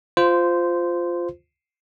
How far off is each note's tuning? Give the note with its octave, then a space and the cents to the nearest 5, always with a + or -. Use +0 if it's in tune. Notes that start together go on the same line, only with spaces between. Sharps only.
F4 +0 C5 -15